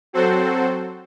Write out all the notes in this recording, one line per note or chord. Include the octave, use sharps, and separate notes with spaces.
F#3 C4 F#4 A4 C5